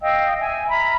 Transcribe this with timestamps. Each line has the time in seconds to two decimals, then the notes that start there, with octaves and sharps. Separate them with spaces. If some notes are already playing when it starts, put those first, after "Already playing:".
0.01 D#5 F5 G5 E6
0.39 E5 G#5
0.69 E5 A#5 B5 F6